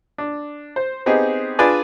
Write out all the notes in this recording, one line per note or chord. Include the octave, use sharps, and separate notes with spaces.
D4
C5
B3 C4 D#4 G4 G#4
D4 F4 G#4 B4 D5 G#5